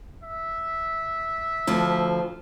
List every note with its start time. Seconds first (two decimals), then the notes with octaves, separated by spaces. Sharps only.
0.23 E5
1.67 D2 F3